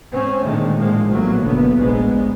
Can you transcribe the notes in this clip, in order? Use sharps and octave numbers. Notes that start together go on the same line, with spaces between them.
G#2 C4 C#4
A#2 D3 D#3 G#3 A3
A2 F3 G#3 A#3
A#1 A2 F#3 A#3 B3
F#1 B1 D3 B3
F1 A#1 G#2 G#3 B3